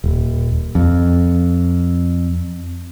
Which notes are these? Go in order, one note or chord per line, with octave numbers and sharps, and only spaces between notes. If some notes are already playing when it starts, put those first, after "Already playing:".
D#1
F2